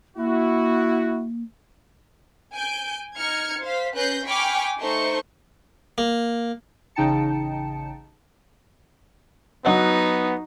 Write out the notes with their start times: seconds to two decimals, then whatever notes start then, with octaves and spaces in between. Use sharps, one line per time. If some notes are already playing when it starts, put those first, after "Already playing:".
0.17 A#3 E4 F#4
2.55 G#5 G6 D7
3.17 D#4 F6 G#6 C#7
3.63 C5 F5 B6
3.94 C#4 B4 F#6 G6 A#6 C7
4.25 G5 G#5 B5 C#6 D6 F6
4.79 A3 D#4 C5 C#6 G6
5.98 A#3
6.95 A1 C#3 D#4 G5 A5 C#7
9.65 F#3 B3 D#4 D#5 F#5